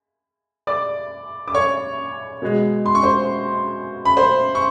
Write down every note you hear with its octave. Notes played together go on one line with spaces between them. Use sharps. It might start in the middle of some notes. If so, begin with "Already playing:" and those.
D5 D6
D6
C#5 C#6
B2 G#3
C6
C#6
C5 C6
B5
C5 C6
C#6